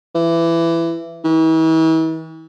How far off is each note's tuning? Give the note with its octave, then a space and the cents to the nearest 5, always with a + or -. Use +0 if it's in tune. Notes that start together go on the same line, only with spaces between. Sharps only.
E3 +20
E3 -40